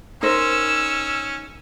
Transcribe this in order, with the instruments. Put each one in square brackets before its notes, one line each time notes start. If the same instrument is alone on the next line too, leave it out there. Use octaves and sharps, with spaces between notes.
[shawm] C#4 [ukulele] D#4 A#4 C5 [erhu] E6